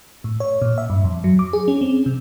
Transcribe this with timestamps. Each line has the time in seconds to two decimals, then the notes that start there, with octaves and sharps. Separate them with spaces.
0.24 A2
0.40 C#5
0.62 A#2
0.78 E5
0.90 G2
1.04 F2
1.24 F#3
1.39 D6
1.53 G#4
1.68 C#4
1.81 C4
2.06 C3